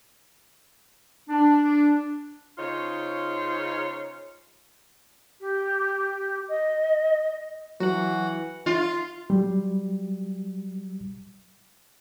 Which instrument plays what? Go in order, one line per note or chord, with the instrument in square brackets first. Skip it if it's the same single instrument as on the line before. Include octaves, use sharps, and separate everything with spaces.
[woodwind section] D4
[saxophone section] C#3 D#4 F4 C5 C#5
[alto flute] G4
D#5
[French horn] E3 [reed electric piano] F#3 [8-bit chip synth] F#4 F#5
[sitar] F4
[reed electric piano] F#3 G3